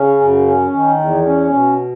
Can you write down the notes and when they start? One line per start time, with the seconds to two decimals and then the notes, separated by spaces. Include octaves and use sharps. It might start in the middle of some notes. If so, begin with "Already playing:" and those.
Already playing: C#3 C#4
0.21 F#2
0.47 C#4
0.73 D#3
1.00 E2
1.26 C#4
1.53 B2